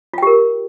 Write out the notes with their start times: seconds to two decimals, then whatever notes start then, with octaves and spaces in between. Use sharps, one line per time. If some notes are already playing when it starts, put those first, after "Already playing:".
0.14 F4
0.18 G5
0.22 G4
0.27 A#4